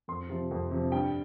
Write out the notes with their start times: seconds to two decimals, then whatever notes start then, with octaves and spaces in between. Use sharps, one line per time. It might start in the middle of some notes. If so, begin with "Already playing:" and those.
0.08 F2 C6
0.29 C3 F3
0.51 F2
0.71 C3 F3
0.92 G2 G5